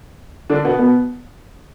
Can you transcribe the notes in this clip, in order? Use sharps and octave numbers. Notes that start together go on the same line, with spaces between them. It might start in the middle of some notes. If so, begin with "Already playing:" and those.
D3 D4
B2 B3
B2 B3